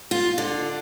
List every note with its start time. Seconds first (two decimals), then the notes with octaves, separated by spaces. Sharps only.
0.11 F4
0.38 D3